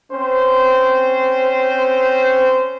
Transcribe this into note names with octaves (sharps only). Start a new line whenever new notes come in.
C4 C#4 C5